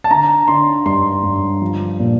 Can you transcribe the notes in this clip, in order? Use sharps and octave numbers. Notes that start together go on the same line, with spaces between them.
A5
D3 A#5
D3 C6
G2 C6
G2
F3
A#2